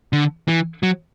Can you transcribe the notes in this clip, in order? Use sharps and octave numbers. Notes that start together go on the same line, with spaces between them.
D3
E3
F#3